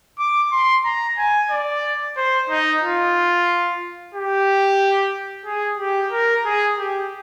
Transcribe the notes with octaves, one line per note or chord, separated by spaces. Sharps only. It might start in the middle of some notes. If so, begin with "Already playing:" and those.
D6
C6
A#5
G#5
D5
C5
D#4
F4
G4
G#4
G4
A#4
G#4
G4